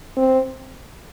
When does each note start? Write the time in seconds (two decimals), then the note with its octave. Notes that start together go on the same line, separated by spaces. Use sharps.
0.17 C4